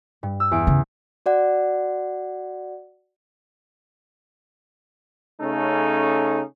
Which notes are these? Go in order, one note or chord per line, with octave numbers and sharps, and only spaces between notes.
G2
E6
E2 D7
C#3
F#4 D5 F#5
C#3 A3 C#4 D#4 A4